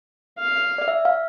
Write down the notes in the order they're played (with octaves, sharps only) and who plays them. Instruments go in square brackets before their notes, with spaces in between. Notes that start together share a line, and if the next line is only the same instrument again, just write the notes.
[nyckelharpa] F5
[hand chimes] D5
E5
F5